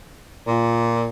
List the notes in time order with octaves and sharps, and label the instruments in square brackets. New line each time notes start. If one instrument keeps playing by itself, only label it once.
[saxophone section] A#2